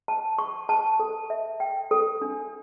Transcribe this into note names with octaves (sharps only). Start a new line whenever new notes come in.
A5
C#6
A5
A4
E5
G5
A4
D4